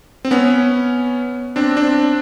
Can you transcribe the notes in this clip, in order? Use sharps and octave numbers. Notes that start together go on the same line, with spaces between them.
C4
B3 C#4
C4 D4
C4 D4